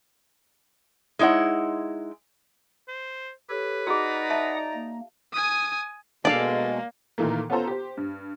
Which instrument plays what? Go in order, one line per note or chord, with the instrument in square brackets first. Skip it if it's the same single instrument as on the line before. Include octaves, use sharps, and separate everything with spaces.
[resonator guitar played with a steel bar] G#3 D#4 E4 C#5 F#5
[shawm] C5
[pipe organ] G4 A4 C#5 [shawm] B4
[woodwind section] D#4 D5 A#5 [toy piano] F#4 G#4 [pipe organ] F#5 D#6
[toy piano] E5 A5
[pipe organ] A#3
[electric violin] G#5 D#6
[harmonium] B2 G#3 [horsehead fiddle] A#3 [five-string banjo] D4 A4 [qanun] D5 F5
[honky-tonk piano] A#2 D#3 E3 A3 A#3
B3 C#4 F4 A4 C5 A#5
G4 C5
G2